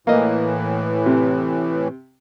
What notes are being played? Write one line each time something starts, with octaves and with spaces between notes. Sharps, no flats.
A2 E3 A#3 D#5
C3